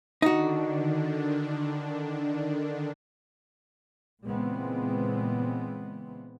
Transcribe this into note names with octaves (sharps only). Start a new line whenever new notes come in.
D3 D#3 D4 D#4 F#4
A#2 C#3 E3 G#3 B3 C4